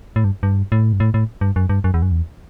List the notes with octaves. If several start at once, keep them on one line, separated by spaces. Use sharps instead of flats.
A2
G2
G2
A2
G2
A2
A2
G2
F#2
G2
F#2
E2
F#2
E2